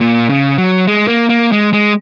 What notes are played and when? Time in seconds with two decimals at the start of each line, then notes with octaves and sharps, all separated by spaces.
0.01 A#2
0.29 C#3
0.58 F#3
0.87 G#3
1.08 A#3
1.29 A#3
1.52 G#3
1.73 G#3